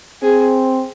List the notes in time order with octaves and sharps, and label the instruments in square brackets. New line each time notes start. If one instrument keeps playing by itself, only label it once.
[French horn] C4 [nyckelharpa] G#4